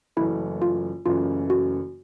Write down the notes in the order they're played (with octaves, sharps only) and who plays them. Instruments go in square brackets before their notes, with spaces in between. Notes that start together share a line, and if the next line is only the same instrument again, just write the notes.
[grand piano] F#1 F#2 C#3 E3 A3 [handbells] E4
[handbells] F4
[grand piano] F#1 F#2 C#3 E3 A3 [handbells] F4
[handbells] F#4